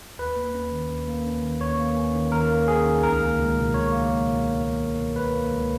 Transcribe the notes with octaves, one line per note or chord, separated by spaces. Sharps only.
D#2 B4
A#3
C#4
D#3
D#2
A#3
C#4
D#3
D#2 C#5
A#3
C#4
D#3
D#2 A#4
A#3
C#4 G#4
D#3
C#2 A#4
A#3
C#2
B2
C#2 C#5
A#3
C#2
B2
C#2
A#3
C#2
B2
C#2 B4
A#3
C#2